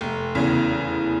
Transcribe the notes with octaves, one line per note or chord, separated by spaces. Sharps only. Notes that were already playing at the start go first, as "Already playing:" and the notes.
F1
E2 C#3